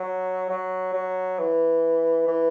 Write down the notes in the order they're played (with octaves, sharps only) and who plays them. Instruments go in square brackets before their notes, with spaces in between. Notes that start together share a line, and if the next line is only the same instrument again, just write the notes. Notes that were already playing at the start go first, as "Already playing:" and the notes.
Already playing: [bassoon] F#3
F#3
F#3
E3
E3